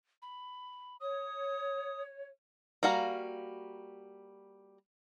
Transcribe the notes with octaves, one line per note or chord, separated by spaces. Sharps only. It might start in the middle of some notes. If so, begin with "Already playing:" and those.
B5
C#5 D#6
G3 A#3 F#4 F5 A#5